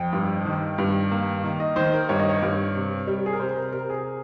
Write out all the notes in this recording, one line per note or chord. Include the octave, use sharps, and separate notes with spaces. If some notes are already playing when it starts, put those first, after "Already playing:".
Already playing: F2 G5
G2
D#3
G2
A#3
D#3
D#5
D#3 C5
A#4
G2 C#5
D#5
C#5
G2
C3
G3
G#4
A#4
C3 C5
A#4
C3 A#4
G#4